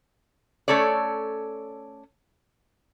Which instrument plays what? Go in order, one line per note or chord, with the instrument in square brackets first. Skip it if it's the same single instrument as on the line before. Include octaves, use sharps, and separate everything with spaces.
[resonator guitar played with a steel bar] A3 C#4 A4 C#5 D5